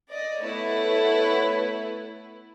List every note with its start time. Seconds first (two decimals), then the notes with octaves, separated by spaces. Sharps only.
0.11 D5 D#5
0.42 A3 B3 E4 B4 C#5